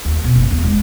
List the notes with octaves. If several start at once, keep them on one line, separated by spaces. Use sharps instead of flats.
D#2
B2
F#1
E2
G#3